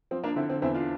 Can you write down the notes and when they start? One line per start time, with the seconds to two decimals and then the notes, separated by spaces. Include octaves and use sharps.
0.11 F3 C4
0.24 A#3 D4
0.36 D3 C4 E4
0.50 C4
0.62 E2 C4 E4
0.75 D4 F4